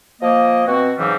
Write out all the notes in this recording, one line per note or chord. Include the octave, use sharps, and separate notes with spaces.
F3 A#3 D#5
B2 C4 F#4
G#2 C#3 E3 F#3 G3 C4